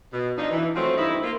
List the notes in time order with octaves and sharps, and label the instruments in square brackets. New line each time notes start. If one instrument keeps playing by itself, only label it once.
[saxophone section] B2
F3 D4 D#4
E3
F3 F#3 A3 C4
G2 D#4 E4
A#3 F4